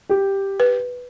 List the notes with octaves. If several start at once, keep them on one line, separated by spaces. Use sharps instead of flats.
G4
B4